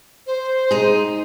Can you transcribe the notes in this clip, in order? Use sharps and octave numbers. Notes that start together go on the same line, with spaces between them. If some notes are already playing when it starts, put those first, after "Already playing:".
C5
D#4 G#4